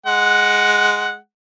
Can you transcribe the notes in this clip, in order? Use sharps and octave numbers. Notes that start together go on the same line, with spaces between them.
G#3 F#5